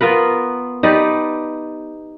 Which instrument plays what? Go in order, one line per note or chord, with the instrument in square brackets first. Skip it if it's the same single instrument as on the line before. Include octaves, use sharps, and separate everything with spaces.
[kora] B3 F4 A#4 B4
D#4 G4 B4 D5